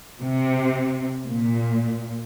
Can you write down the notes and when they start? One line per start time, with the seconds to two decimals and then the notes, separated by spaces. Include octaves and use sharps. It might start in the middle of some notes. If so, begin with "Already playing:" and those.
0.23 C3
1.26 A#2